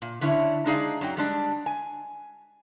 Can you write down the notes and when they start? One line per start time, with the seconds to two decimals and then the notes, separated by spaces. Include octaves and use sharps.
0.02 A#2
0.21 D3 C#4 D4 E4 C#5
0.65 G#3 D4 D#4 G#4 D5 F5
1.01 F#2 F#3 D#4 G5
1.17 G3 G#3 D4
1.66 G#5